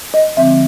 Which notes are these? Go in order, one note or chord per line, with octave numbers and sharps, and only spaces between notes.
D#5
D3 F3 G#3 C4 E5